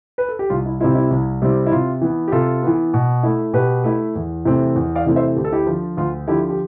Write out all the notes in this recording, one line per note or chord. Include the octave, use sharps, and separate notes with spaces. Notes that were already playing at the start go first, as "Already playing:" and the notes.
B4
A4
G4
C2 F4
E4
C3 G3 C4 E4 F4
E4
C2
C3 G3 C4 E4
E4
C3 F4
E3 B3
G4
C3 F4 A4
E3 B3
B2
A3 E4
B2 G4 B4
A3 E4
E2
C3 E3 A3 C4
E2
D5 F5
C3 E3 A3 C4
C5 E5
D2 G4
A4
E4 G4
D3 F3
D2 F4
D3 F3 E4 G4
G4